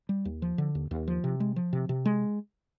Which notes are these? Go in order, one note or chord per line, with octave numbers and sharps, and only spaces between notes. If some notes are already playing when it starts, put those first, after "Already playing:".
G3
D#2
F3
D3
D#2
D#2
F3
C3
G#3
F3
C3
C3
G#3